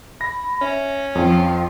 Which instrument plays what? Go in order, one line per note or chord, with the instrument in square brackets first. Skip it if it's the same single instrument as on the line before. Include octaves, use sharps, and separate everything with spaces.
[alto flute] B5 [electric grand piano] A#6
[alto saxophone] C#4 [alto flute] E5
[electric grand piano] F2 [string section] F3 F4 [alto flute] G5